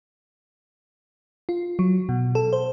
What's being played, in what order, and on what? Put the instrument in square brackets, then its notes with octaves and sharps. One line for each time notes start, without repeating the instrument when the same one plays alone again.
[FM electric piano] F4
F#3
B2
A4
C5